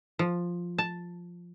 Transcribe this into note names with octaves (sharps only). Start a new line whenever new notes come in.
F3
A5